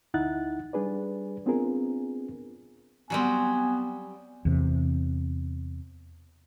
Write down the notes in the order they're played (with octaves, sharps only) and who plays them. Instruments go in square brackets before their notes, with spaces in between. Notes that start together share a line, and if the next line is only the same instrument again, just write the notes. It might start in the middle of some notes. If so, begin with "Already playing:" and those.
[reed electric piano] D2 D#4 E4 F#5 F#6 A6
G3 D4 G#4 B4 D5
B3 C4 D4 F4 G#4 A#4
[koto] F#3 G3 C4 [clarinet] B3 [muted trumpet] G#5
[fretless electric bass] E2 C3